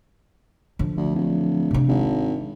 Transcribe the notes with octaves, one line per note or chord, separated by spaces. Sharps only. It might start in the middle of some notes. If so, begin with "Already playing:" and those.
D3 F3
D2
D1
C3 D4
G#1